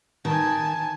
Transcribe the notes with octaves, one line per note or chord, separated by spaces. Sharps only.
D#3 G#5 A5